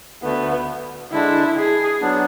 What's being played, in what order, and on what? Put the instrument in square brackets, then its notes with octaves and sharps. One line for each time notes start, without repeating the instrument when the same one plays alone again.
[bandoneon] D2 D3 A3 [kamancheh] B3
[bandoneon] D3 G#3 D4 [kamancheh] E4
[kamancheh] G#4
[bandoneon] F#3 B3 D4